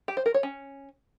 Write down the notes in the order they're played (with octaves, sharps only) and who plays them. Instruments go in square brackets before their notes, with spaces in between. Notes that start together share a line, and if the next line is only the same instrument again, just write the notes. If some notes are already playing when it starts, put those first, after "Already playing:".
[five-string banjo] G4
C5
A#4
C#5
C#4